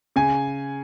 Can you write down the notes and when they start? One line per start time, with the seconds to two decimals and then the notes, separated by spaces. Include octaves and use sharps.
0.16 C#3 G#5